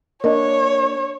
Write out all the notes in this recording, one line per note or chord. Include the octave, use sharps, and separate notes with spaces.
A#3 D4 A#4 C#5 D#5